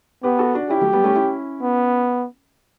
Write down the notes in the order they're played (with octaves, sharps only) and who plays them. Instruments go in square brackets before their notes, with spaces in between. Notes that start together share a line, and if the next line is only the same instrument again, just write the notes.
[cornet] B3 [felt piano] G4 B4
[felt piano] F#4 A4
D4 F#4
[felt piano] C#4 E4 [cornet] G4
[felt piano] F#3 A3
G3 B3
A3 C#4
C#4 E4
[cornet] B3